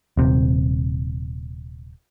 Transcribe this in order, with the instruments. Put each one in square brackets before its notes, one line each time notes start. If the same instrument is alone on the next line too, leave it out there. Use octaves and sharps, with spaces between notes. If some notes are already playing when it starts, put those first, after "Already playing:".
[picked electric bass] D#1 C3